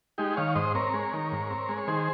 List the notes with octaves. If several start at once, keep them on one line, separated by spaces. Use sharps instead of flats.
G#3 D#4 G4
D#3 C#5 F5
G#2 C5 D#5
C4 A#4 C#5
G#3
D#3
G#2
C4
G#3
C#5
D#3 G#4 C5